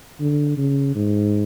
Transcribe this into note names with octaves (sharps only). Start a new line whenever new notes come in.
D3
C#3
G#2